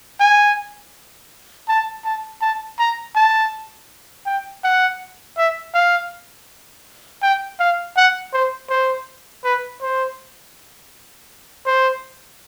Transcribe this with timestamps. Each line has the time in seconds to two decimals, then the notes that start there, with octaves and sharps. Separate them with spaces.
0.20 G#5
1.68 A5
2.05 A5
2.41 A5
2.79 A#5
3.16 A5
4.26 G5
4.64 F#5
5.38 E5
5.74 F5
7.22 G5
7.60 F5
7.96 F#5
8.33 C5
8.70 C5
9.44 B4
9.82 C5
11.66 C5